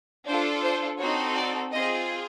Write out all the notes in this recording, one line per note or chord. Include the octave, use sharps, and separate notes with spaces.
D4 F4 A4 C5
C5
C4 D#4 F#4 A4 C#5
D5
C4 F4 G#4 D#5